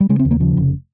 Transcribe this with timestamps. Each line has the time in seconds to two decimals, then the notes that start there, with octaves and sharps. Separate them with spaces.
0.01 G3
0.09 C#3 G#3
0.19 C4
0.25 D#2
0.31 A#3
0.40 C#3 F3
0.57 F1